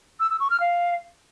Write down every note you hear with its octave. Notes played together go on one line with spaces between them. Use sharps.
E6
E6
C#6
F6
F5